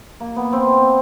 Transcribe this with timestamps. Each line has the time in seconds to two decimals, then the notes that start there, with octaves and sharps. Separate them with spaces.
0.20 A#3
0.36 B3
0.53 C4